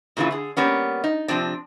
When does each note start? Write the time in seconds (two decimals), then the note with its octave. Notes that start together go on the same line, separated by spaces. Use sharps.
0.17 A#2 C#3 E3 E4 F4
0.31 D3 G#4
0.57 G3 A#3 B3 C#4
1.04 D#4
1.28 C3 F3 C4 D4